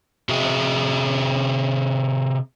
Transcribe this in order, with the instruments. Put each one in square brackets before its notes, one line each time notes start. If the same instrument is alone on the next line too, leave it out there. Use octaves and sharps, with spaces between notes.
[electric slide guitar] C3 F#4 G#4 E5